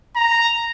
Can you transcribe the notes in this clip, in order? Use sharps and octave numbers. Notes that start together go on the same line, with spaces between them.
A#5